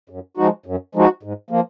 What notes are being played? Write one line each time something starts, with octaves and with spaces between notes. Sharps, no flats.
F#2
F3 G#3 D#4 F#4
F#2
F3 G#3 D#4 F#4
G#2
F3 A#3